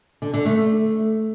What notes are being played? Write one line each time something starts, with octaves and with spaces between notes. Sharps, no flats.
D3
D3
A3